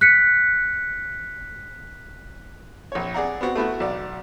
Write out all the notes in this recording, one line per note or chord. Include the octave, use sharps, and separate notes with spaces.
F#6 B6 C#7
A#1 C#5
G#4 D5 F#5 A#5
B3 C4 F#4
A3 B3 E4 F#4
B1 D5